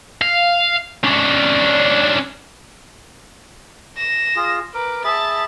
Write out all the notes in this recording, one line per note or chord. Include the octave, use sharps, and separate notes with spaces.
F5
C#4 D4
A#6 E7
F4 G#4
A#4 B4 D6
G#4 E5 A5 B5 A6